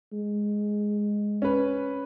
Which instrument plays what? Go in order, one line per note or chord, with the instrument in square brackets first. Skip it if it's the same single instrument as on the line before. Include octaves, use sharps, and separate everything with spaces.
[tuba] G#3
[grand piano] C#4 B4